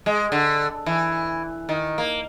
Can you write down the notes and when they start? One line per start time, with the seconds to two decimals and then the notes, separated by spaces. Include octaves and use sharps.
0.06 G#3
0.32 D3
0.86 E3
1.69 D#3
1.98 A#3